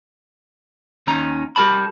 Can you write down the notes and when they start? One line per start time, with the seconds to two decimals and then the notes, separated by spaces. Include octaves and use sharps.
1.07 D#2 D#3 C#4 D#4 A#5
1.56 G3 G4 A#4 D5 A5 B5